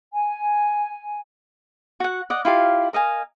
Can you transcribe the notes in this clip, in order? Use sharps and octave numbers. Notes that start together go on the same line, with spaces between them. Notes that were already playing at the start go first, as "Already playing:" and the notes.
G#5
F#4 F#5
D5 D#5 F#5
E4 F4 G4 F5
A#4 D#5 F5 G#5